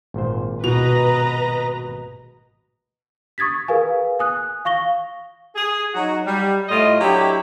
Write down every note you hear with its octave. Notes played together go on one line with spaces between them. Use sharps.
G#1 A#2 C5
B2 B4 D#5 A#5 F7
C#6 D#6 G#6 A6 B6
G#4 A#4 B4 F5 G#5
G#5 D#6 F#6
F5 C#6 A#6 G7
G#4
F#3 D#4 F#4
G3
A2 A3 F4 D#5
F#3 D4 E4 G4